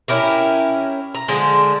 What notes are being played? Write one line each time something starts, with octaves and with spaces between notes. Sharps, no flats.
C#4 E4 G4 A#4
A#5
D3 F3 G#3